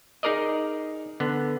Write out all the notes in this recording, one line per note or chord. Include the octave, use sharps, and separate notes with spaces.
D#4 G#4 A#4 D5 D#5
D3 B3